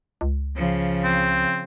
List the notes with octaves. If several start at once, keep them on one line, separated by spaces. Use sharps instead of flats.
C#2
C#3 F3
C4